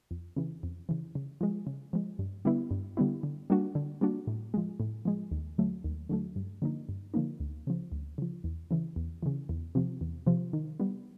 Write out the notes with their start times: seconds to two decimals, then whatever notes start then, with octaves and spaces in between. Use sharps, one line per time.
0.11 F2
0.36 C#3 E3
0.63 F2
0.89 C#3 E3
1.15 C#3
1.41 F3 G#3
1.67 C#3
1.93 F3 G#3
2.19 G2
2.45 D3 G3 B3 E4
2.71 G2
2.97 D3 G3 B3 E4
3.23 D3
3.50 G3 A#3 D4 F#4
3.75 D3
4.01 G3 A#3 D4 F#4
4.27 A2
4.54 F3 G#3
4.80 A2
5.05 F3 G#3
5.31 D#2
5.58 D3 F#3 A3
5.84 D#2
6.09 D3 F#3 A3
6.36 G2
6.62 D3 F3 A#3 D#4
6.89 G2
7.14 D3 F3 A#3 D#4
7.40 D2
7.67 C#3 F3
7.92 D2
8.18 C#3 F3
8.44 E2
8.71 C#3 E3
8.96 E2
9.23 C#3 E3
9.49 E2
9.75 C3 F3
10.01 E2
10.27 C3 F3
10.53 D#3
10.80 G3 B3